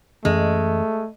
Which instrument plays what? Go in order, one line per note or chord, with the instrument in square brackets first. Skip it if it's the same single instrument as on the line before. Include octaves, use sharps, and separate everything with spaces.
[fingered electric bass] F#2 E3 C#4 [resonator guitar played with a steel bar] G#3 [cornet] A3